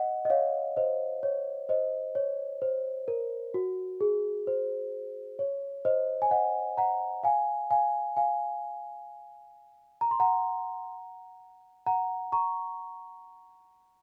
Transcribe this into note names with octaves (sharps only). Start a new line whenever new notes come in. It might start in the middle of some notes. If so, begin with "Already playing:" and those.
Already playing: D#5 F#5
D#5
C#5 F5
C5 D#5
C#5
C5 D#5
C#5
C5
A#4
F#4
G#4
C5
C#5
C5 D#5
G#5
D#5 F#5
F#5 A#5
F5 G#5
F5 G#5
F5 G#5
A#5
C6
F#5 A#5
F#5 A#5
A#5 C#6